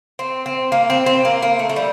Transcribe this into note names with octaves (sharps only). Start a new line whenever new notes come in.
C4
C4
A#3
C4
C4
A#3
A#3
A3
A3
G3